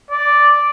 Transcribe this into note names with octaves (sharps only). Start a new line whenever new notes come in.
D5